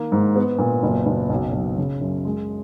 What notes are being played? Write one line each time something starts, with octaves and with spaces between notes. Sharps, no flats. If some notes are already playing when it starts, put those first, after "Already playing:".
Already playing: D#3 A#3
G#2
B3
A#2
F#1
F#1
B1
B1
C#3
F#2
G#3